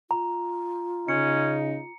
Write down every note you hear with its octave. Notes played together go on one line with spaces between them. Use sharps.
F4 A#5
C#3 C#4 D#4 C#7